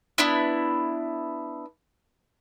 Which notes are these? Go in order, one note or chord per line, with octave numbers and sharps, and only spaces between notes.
B3 D4 E4